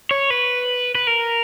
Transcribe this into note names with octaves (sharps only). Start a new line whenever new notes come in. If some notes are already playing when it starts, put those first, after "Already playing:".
C#5
B4
B4
A#4